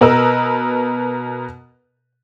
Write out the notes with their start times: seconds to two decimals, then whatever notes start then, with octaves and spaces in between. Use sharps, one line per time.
0.01 B2 A#4 B4 D#5 E6